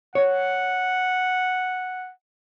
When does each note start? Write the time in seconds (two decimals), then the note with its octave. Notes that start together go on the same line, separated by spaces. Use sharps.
0.15 C#5 F#5